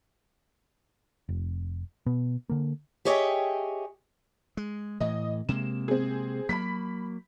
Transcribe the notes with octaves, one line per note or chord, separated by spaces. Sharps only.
F1
B2 B3
D3 A#3
G4 G#4 C#5 D#5 E5 G5
G#3
A2 E3 D#5
C3 G#3 A#3 E7
C4 G#4
F#3 A#3 B5 B6